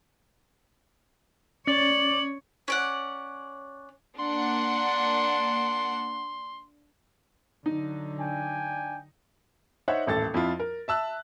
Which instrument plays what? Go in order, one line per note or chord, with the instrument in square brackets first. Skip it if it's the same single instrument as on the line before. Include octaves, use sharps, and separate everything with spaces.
[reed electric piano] C#4 [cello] C#5 [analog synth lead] D5 [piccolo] F#7
[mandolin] C#4 D5 F#5
[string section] A#3 D4 F#5 [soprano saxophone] C6
[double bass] D3 F#3 [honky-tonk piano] D#4
[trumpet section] D4 G5 G#5
[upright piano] D#4 C5 C#5 E5 F#5
D#1 A1 A4 A6
F2 E4 F4
A#4
E5 A5 E6 F#6